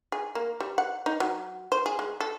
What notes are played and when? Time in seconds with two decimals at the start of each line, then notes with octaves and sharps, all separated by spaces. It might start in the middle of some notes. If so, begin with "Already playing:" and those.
0.12 G#4
0.35 A#3
0.60 G3
0.78 F#5
1.06 D#4
1.20 F#3
1.72 C5
1.86 G#4
1.99 G#3
2.20 A4